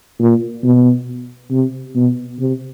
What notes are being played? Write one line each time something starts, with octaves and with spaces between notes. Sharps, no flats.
A#2
B2
C3
B2
C3